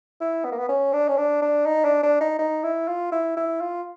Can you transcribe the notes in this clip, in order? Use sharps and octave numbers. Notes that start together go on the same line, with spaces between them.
E4
B3
A#3
B3
C#4
D4
C#4
D4
D4
D#4
D4
D4
D#4
D#4
E4
F4
E4
E4
F4